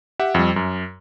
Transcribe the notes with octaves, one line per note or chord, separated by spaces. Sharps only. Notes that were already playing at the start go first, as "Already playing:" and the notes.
G4 E5 F#5
F2 G3
F#2